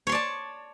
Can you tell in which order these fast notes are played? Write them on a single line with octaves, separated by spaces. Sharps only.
C#5 C6 D5 A5